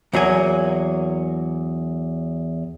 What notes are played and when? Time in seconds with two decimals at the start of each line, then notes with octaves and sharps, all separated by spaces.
0.13 E2 F#3 A#3 G#5